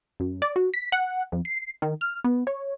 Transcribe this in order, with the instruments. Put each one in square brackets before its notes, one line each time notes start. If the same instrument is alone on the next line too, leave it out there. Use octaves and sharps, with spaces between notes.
[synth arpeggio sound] F#2
D5
F#4
B6
F#5
F2
C7
D#3
F6
B3
C#5